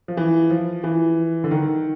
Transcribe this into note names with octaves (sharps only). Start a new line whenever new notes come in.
F3
E3
F3
E3
D3
D#3